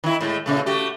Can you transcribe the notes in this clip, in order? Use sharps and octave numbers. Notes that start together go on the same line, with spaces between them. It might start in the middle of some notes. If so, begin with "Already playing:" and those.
D#3 E4
A2 G#3 A3
A#2 C#3 A3
A3 F#4 G4